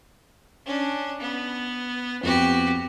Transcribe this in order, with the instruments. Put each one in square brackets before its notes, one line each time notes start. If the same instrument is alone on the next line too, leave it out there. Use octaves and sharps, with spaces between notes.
[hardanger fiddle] C#4 D4
B3
[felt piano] F2 B3 [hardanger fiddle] F#4 G4